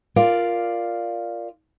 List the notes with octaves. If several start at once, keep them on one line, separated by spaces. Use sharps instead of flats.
F4 A#4 D5 F5